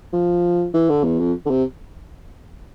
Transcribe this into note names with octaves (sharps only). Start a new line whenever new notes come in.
F3
E3
D3
E2
F2
D3
C3